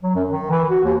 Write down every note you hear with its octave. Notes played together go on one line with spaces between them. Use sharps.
F#3
F#2
D#3
E3
F#4
D#2